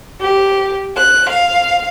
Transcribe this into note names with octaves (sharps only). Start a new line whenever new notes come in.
G4
F#6
F5